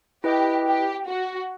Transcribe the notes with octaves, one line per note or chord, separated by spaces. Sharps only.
E4 G4 B4 D#5 G5
G4
F#4